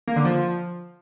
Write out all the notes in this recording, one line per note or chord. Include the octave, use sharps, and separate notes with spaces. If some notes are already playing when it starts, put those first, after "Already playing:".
A#3
D3
F3